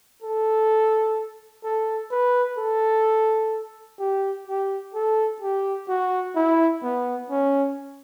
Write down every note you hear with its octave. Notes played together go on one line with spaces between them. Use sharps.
A4
A4
B4
A4
G4
G4
A4
G4
F#4
E4
B3
C#4